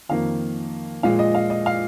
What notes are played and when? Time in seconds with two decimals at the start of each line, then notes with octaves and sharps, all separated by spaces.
0.09 F2 D#3 A#3 F5
1.03 A#2 F3 G#3 F5
1.19 D#5
1.35 F5
1.50 D#5
1.66 F5